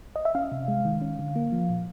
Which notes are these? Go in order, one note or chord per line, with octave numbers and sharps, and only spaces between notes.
D#5
E5
C#4 F5
C3
G#3
D#3
C#4
D3
A#3
F3
A#2